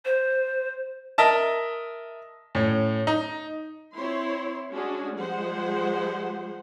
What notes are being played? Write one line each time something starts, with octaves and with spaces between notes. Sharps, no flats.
C5
A#4 D#5 E5 A5
A2 C#4
D#4
C4 E4 C#5 C6
G#3 C#4 D4 F#4 G#4
F3 G3 G#3 C5 F#5